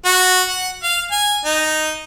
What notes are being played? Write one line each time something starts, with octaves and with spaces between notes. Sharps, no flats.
F#4
F#5
F5
G#5
D#4